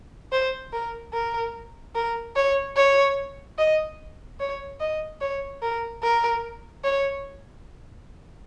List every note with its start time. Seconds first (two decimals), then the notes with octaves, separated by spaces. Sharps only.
0.32 C5
0.72 A#4
1.13 A#4
1.95 A#4
2.36 C#5
2.76 C#5
3.58 D#5
4.40 C#5
4.80 D#5
5.21 C#5
5.63 A#4
6.03 A#4
6.84 C#5